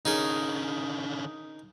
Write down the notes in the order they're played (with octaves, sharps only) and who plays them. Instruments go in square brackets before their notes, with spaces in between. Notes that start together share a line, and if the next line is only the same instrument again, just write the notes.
[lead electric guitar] D3 C#4 [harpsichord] D#4 G#4 A#4